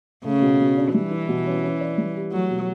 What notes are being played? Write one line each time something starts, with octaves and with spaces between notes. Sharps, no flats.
C#3 A3
B2
B2
D4
E3 G3
E4
B2
C#4
C#4
D5
G3
G4
F#3 A3
B2